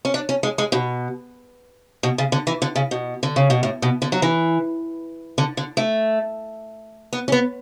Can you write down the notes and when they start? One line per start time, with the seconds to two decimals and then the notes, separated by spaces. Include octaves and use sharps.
0.05 C#4
0.14 D4
0.29 C#4
0.43 G#3
0.58 G#3
0.72 B2
2.03 B2
2.18 C#3
2.32 D3
2.47 E3
2.62 D3
2.76 C#3
2.91 B2
3.23 D3
3.36 C#3
3.50 B2
3.63 A2
3.82 B2
4.02 D3
4.12 F#3
4.22 E3
5.38 D3
5.57 D3
5.77 A3
7.13 B3
7.28 C#4
7.32 B3